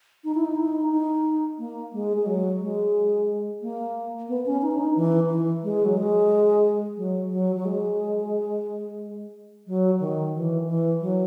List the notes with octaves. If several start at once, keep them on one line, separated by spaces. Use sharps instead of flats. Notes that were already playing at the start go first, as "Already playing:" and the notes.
D#4
E4
D#4
E4
D#4
D#4
A#3
G#3
G#3
F#3
G#3
A#3
B3
C#4
D#4
C#4
D#4
E3
E3
G#3
F#3
G#3
F#3
F#3
F#3
G#3
F#3
D#3
E3
E3
F#3